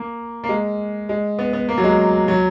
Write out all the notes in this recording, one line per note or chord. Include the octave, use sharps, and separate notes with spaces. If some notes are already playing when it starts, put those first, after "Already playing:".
Already playing: A#3
A#3
G#3
G#3
B3
B3
A#3
F#3
G#3
F#3